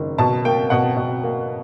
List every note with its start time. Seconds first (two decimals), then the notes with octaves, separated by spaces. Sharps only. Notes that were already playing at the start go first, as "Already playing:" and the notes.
Already playing: F#1 D#3
0.18 B2 A5
0.45 A#3 G5
0.70 B2 F#5
0.97 B2
1.23 A#3